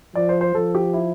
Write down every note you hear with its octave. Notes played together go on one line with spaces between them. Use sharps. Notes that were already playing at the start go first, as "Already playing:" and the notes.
F3 D5
C5
C5
F3 A4
G4
E4